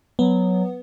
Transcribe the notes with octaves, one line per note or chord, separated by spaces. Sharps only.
F#3 B3